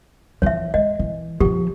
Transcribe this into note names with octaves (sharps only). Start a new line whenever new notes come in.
E3 F3 C#5 E5
G#3 D#5
E3
C#3 F3 G4